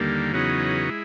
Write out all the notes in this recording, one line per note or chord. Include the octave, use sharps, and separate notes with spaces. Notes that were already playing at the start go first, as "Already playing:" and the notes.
Already playing: D#2 D3 G3 A#3
E2 C#3 F#3 B3 D#4
G#3 E4